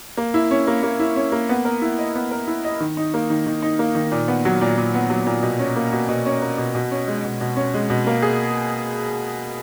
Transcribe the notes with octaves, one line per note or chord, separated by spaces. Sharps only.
A#3
E4
C#4
A#3
A#3
E4
C#4
A#3
B3
A#4
E4
D#5
B3
A#4
E4
D#5
D#3
D#4
A#3
D#3
D#3
D#4
A#3
D#3
A#2
B3
F#3
A#2
A#2
B3
F#3
A#2
B2
C#4
A#3
B2
B2
C#4
A#3
B2
B2
C#4
G#3
B2
B2
C#4
G#3
B2
A#3
G#4